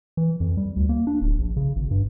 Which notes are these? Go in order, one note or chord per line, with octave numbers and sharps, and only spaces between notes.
E3
F2
G3
D2
A#3
D4
D1
A#1
C#3
G#1
G2